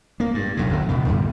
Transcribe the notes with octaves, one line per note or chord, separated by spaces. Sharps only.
A#3
G2
E1 B1 A2
D1 D3 F#3
C#2 B2 B3
F#2 D3 G3